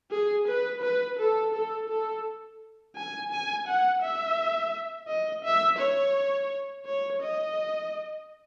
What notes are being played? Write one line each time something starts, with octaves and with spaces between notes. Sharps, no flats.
G#4
B4
B4
A4
A4
A4
G#5
G#5
F#5
E5
D#5
E5
C#5
C#5
D#5